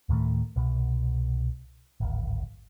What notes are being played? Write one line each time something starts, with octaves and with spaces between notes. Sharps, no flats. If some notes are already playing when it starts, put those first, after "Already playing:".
D2 A2 D#3 A3
C2 B2
D1 G#1